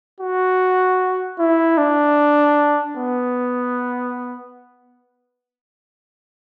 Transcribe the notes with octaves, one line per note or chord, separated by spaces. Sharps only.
F#4
E4
D4
B3